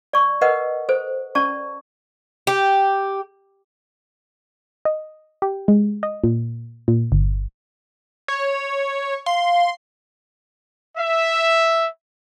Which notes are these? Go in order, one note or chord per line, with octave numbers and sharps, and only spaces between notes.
D5 C#6
A#4 B4 D#5 F#5
A4 C5
C#4 D5 A5 C#6
G4
D#5
G4
G#3
D#5
A#2
A#2
G1
C#5
F5 C6
E5